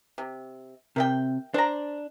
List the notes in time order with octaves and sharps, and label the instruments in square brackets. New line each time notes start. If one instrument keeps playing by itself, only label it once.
[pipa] C3
[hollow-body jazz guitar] C3 [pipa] A#4 E5 G5
[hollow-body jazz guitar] D4 [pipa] C5 A#5